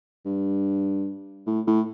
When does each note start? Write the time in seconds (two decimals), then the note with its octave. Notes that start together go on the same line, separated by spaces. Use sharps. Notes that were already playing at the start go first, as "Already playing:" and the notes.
0.25 G2
1.47 A2
1.67 A2